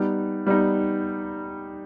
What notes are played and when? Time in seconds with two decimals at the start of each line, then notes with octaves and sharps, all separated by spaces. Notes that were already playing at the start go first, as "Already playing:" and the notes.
Already playing: G3 B3 D#4
0.47 G3 B3 D#4